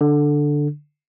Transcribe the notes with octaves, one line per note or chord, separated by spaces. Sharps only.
D3